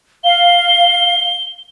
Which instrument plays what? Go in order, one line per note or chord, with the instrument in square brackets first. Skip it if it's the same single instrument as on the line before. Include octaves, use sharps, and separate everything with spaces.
[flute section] F5 [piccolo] G7